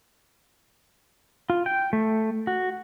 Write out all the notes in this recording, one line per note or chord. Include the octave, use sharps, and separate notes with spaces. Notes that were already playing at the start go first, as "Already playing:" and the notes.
F4
G5
A3
F#4